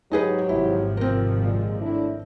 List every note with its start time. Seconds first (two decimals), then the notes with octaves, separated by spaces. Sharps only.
0.12 G#2 F#3 D#4 G4 G#4 B4
0.49 G#1 C3 F3 E4
0.97 C4 A#4
1.41 A#2 G#3
1.80 A2 D4 E4